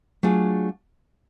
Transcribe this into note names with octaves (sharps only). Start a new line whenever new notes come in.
F#3 A3 D4 F4 G#4